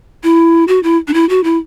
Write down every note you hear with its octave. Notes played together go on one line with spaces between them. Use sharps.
E4
F#4
E4
D4
E4
F#4
E4